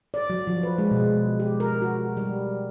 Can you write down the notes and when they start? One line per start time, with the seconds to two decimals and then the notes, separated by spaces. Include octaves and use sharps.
0.14 D5
0.30 F#3
0.47 F3
0.63 B4
0.78 G#3
0.91 B2
1.40 G4
1.60 A#4
1.82 F#4
2.17 G3